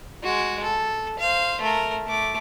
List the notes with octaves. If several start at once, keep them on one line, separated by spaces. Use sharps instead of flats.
G#3 F#4
A4
C5 F5
A3 A#4
A3 D6